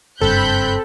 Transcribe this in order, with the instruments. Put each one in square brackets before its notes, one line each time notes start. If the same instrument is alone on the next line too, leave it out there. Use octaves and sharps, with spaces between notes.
[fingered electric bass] F#1 G2 [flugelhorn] C4 [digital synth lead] A4 [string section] B5 F#6 G6